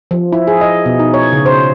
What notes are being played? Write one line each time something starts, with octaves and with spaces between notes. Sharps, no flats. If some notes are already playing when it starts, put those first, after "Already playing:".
F3
E4
G#4
D#5
B2
D#4
C#5
C#3
C5